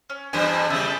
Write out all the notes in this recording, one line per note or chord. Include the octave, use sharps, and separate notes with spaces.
C#4
E2 G2 C5 G#5
C#3 G3 G#4 A4 E5